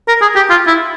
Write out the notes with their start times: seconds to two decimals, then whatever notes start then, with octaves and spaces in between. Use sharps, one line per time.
0.08 A#4
0.22 G#4
0.36 G4
0.50 F4
0.67 E4